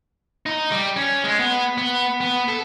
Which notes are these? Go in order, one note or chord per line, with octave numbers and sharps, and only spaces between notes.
D#4
G3
C#4
G#3
B3
B3
B3
A4